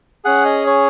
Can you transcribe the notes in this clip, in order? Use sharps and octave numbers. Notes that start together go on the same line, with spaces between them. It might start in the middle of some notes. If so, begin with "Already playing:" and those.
C#4 G#4 F#5
D#5
C#5